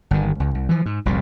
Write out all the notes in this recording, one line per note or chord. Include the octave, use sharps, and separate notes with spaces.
G1 D#3
C#2
C2
E3 F3
G#2
F1 C2 A#2